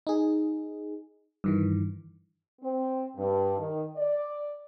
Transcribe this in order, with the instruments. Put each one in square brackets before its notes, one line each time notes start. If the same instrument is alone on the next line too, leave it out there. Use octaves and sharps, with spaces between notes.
[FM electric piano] D#4 G#4
G2 D#3 E3
[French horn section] C4
G2
D#3
D5